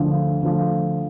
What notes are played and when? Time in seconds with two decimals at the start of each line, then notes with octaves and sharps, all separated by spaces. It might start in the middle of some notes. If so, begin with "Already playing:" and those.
Already playing: D2 D3 F3
0.43 D2 D3 F3